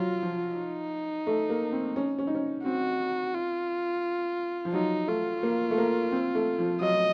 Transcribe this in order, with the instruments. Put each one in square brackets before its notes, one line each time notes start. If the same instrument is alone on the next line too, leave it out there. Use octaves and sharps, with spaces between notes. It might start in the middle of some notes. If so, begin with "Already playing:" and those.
Already playing: [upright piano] F#3 [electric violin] F4
[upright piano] F3
[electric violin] D#4
[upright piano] A3
A#3
C4
C#4
C#4
D#4
C#4
[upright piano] C4 [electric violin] F#4
[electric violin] F4
[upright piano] F3
[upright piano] F#3 [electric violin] D#4
[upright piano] A3 [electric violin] F4
[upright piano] A#3
A3
A#3
C4
A3
F3
[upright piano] F#3 [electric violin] D#5